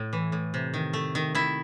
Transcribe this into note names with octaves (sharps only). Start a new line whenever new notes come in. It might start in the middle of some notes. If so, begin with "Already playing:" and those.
Already playing: A2
E3
A2
C3
D#3
A3
D#3
D#3 E4